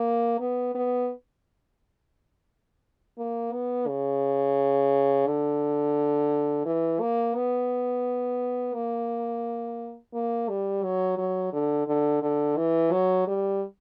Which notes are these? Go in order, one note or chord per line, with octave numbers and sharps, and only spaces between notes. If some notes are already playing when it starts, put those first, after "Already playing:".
Already playing: A#3
B3
B3
A#3
B3
C#3
D3
E3
A#3
B3
A#3
A#3
G3
F#3
F#3
D3
D3
D3
E3
F#3
G3